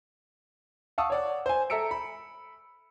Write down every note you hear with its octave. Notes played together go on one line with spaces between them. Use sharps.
F5 F#5 A5 C#6 D#6 E6
C#5 D5 F#5
C5 G#5
A4 E5 A#5 E6 C#7 D7
B5